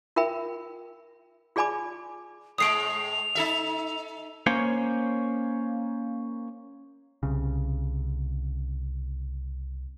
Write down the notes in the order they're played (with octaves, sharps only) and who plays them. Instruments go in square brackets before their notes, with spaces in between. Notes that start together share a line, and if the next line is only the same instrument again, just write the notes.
[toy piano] F4 A#4 E5 G5 B5
F4 G#4 D5 G#5 B5 D6
[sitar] A2 G#3 [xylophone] D#6 C7 D7 [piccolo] F7
[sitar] D#4 A4 E5
[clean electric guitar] A#3 C#4 C5 C#5
[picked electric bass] C2 C#3